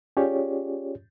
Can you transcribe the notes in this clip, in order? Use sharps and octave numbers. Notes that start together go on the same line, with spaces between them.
C#4 F4 G4 G#4 C#5 D5